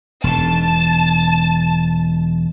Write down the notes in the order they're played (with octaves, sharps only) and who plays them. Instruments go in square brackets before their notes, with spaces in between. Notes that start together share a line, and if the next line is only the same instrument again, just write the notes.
[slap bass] E1 G#2 [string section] A5